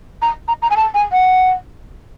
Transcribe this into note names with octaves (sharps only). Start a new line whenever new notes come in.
A#5
A#5
A#5
G#5
A5
G#5
F#5